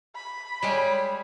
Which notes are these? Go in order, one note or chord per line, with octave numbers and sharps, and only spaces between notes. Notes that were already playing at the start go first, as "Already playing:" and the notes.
B5
G3 G#3 G4 C#5